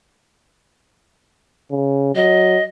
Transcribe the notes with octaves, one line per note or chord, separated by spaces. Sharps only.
C#3
F#3 D#5